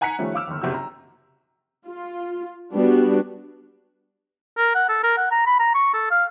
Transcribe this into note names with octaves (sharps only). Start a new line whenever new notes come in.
F#5 G#5 A#5 F#6 B6 C#7
D#3 F3 G3 A3 C#4
F5 D6 E6 F6
G1 D#2
F#1 C3 F#4 E6
A#5
F4
G3 B3 D4 F#4
A#4
F#5
A4
A#4
F#5
A#5
B5
A#5
C#6
A4
F5